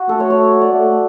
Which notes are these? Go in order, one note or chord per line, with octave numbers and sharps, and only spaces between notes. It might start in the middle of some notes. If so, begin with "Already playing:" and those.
Already playing: F#4
A3 A4
C#5
C#5
D5
A3